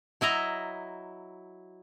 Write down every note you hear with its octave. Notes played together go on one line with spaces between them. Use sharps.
F#3 E4 D#5 A#5